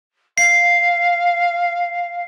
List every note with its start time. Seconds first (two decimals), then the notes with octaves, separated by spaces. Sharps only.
0.38 F5 C7